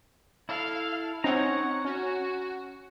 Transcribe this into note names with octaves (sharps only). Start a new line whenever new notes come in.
E4 A4 F5
C4 C#4 D#4 C#5 F#5 A#5
C#4 F#4